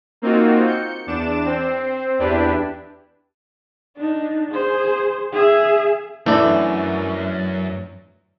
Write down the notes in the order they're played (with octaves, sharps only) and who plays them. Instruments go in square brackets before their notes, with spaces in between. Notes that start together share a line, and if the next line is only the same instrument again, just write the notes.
[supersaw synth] A#3 C4 D#4 F4 F#4
G6 C#7
E2 D4 D6 E7
C4 C5
E2 D4 E4 G4 B4
[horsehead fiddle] D4 D#4
G#4 C5
G#4 E5
[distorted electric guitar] F#2 [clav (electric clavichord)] E3 D4 [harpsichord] A3